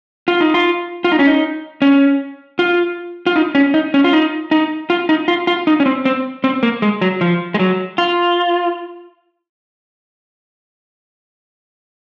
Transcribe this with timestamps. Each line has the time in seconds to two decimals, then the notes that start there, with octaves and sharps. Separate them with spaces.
0.28 F4
0.41 D#4
0.54 F4
1.04 F4
1.12 D#4
1.19 C#4
1.27 D#4
1.82 C#4
2.59 F4
3.27 F4
3.36 D#4
3.55 C#4
3.74 D#4
3.94 C#4
4.04 F4
4.13 D#4
4.51 D#4
4.90 F4
5.09 D#4
5.28 F4
5.47 F4
5.67 D#4
5.80 C#4
5.86 C4
6.05 C4
6.44 C4
6.63 A#3
6.82 G#3
7.01 F#3
7.21 F3
7.54 G#3
7.59 F#3
7.98 F4